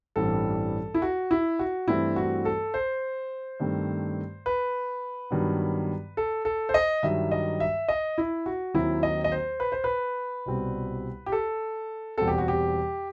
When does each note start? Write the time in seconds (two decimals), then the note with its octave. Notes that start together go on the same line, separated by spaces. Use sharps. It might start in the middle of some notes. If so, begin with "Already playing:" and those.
0.16 A1 G2 E3 G3 C4 A4
0.94 E4
1.02 F#4
1.31 E4
1.59 F#4
1.88 G2 E3 A3 C4 E4
2.16 F#4
2.45 A4
2.74 C5
3.60 G2 D#3 A3 C4
4.46 B4
5.31 G2 D#3 F#3 B3
6.17 A4
6.45 A4
6.69 C5
6.74 D#5
7.03 G2 D#3 F#3 E5
7.31 D#5
7.60 E5
7.88 D#5
8.18 E4
8.46 F#4
8.74 D#2 D#3 F#3 C4 E4
9.03 D#5
9.24 D#5
9.32 C5
9.60 B4
9.72 C5
9.84 B4
10.46 C2 B2 G3 C4
11.26 G4
11.32 A4
12.18 E2 B2 G3 C4 A4
12.28 G4
12.38 F#4
12.48 G4